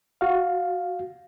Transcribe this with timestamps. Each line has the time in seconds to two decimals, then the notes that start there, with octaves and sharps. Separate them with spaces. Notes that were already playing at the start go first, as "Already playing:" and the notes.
0.21 F#4 F5